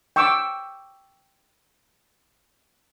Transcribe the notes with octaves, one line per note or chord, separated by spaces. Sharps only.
G5 C#6 D6 E6